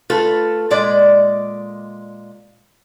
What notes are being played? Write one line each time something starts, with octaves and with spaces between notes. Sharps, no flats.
A3 F4 A4 B4
A#2 G#3 D5